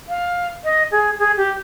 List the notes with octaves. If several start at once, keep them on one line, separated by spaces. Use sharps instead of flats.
F5
D#5
G#4
G#4
G4